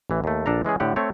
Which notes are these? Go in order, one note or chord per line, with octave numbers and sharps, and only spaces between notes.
A1 E3
D#2 A3
A#1 D4 A4 A#5
E3 G#3 C#4 G#4
A2 D3 G4 F#5
A3 C4 C#5